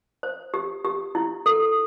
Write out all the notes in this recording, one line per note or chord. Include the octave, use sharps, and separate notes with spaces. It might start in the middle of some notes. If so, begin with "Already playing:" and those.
C5
G4
G4
E4
A4